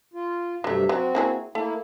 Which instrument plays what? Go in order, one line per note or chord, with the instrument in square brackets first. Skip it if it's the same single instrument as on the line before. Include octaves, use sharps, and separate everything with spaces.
[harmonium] F4
[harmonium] G2 C3 E5 [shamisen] F#3 A3
[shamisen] F#3 [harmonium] C4 F#4
[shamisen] A#3 E4 G#4
[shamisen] A3 [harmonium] A#3 E4